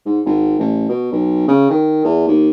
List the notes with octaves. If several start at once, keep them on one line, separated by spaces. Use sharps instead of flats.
G#2
G#1
A1
B2
B1
C#3
D#3
E2
D#2